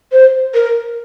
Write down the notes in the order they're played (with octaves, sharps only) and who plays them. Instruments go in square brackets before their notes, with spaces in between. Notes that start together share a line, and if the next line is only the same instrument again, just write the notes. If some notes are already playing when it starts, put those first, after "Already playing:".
[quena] C5
A#4